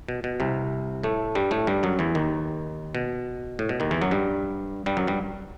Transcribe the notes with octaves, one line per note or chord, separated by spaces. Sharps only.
B2
B2
C2 C3
A2 A3
G2 G3
A2 A3
G2 G3
F#2 F#3
E2 E3
D#2 D#3
B2
A2
B2
D#2 D#3
E2 E3
F#2 F#3
G2 G3
G2 G3
F#2 F#3
G2 G3